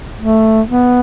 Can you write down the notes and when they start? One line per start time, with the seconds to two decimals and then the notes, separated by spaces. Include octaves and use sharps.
0.19 A3
0.67 B3